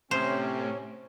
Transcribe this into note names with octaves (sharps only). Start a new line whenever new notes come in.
A2 C3 C#4 C5